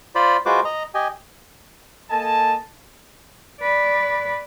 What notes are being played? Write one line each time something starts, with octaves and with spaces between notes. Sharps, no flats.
F4 C5 D5 B5
G#3 F4 F#4 B4 C5 D6
D#5 A#5
G4 D#5 G#5
A#3 A4 D#5 G#5 A5
B4 D5